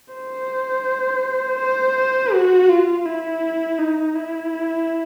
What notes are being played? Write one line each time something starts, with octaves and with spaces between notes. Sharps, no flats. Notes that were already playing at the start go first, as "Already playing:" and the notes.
C5
C5
F#4
F4
E4
D#4
E4